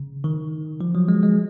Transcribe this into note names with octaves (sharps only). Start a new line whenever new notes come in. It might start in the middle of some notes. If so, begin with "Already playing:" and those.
Already playing: C#3
D#3
F3
F#3
G#3
G#3